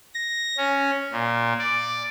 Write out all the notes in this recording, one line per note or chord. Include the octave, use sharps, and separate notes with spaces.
A#6
C#4
A#2
D5